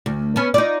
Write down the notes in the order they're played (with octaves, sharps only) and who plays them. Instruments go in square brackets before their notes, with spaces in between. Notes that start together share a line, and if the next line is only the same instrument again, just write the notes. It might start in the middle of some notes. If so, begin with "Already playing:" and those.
[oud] D2
B3 C#4
D#4 F4 D5